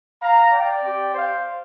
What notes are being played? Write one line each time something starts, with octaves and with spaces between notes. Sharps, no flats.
F5 A#5
D5 G5
C4 G4
C5 F5